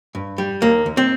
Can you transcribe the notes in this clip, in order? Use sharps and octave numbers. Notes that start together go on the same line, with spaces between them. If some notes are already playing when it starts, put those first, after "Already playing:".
G2
G3
D#2 A#3
D#2
C4